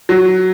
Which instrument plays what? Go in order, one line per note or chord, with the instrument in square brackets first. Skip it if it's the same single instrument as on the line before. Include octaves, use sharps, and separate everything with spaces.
[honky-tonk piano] F#3